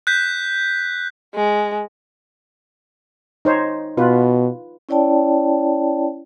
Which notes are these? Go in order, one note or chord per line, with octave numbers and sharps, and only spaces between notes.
F#6 G6 B6
G#3
D#4 C5 C#5
B2 F4 B4
C#4 E4 C#5 D5 G5 A5